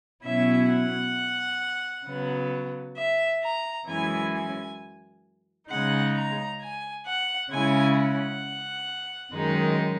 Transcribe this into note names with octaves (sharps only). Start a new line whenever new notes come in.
B2 F#3 C#4 E4 E5
F#5
C#3 F#3 B3
E5
A#5
F#2 E3 G#3 C#4 E4 G#5
G#5
C#3 G#3 D#4 F#5
A#5
G#5
F#5
C#3 G#3 C#4 E4 G#5
F#5
F#2 D#3 G#3 D#4